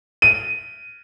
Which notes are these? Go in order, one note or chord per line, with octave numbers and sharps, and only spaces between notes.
D#7